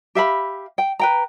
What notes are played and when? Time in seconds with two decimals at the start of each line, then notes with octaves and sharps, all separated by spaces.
0.15 G4 E5 F5 B5
0.78 G5
0.99 B4 G5 A#5